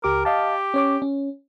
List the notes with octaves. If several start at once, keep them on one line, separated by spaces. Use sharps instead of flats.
C#2 G4 A#4 D6
G4 D#5 F5 A5
C#4 C#5 D6
C#4